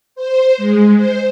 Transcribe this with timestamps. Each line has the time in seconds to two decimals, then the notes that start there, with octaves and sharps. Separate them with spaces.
0.15 C5
0.57 G#3
0.97 C5